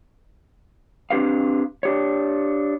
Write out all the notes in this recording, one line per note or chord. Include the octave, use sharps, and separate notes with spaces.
C4 D4 G4 B4 F5
D4 G4 C#5